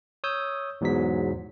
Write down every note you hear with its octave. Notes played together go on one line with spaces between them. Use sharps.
C#5 D#6 E6 G6
E2 G#2 B2 F#3 B6